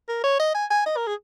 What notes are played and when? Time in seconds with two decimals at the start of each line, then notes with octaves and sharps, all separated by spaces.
0.08 A#4
0.24 C#5
0.40 D#5
0.54 G#5
0.70 G#5
0.86 D#5
0.97 A#4
1.07 G#4